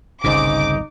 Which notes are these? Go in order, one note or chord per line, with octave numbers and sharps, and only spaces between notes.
G1 C2 A#2 C#3 D#4 C5 G#5 D6